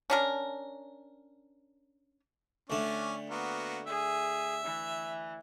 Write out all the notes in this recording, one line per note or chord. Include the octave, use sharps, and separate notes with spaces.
C#4 D4 A#4
D2 A3 C#4 D4
A#3 B3 F#4
G#4 E5
E3